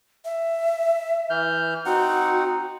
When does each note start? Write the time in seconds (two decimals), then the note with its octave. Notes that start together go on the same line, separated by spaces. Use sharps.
0.25 E5
1.30 E3 F6 G6
1.86 C4 D#4 F#4 F#5